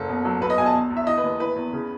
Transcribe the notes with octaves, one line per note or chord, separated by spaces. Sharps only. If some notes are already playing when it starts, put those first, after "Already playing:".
Already playing: F#1 A4
B2
F#3
B1 B4
D#5
B1 G#5
A5
E2
E2
E5
E3 D#5
B4
D#2
E3 B4
E2
C#3